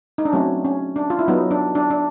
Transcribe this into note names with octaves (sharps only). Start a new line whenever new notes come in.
D#4
D4
F#3 A3 C4 C#4
C#4
D4
F4
E4
F#3 B3 D#4
D4
D4
D4